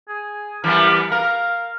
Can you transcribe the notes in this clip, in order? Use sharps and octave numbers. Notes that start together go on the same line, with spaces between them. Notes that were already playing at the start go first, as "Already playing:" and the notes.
G#4
E3 G3 B3 A#4
A#4 F5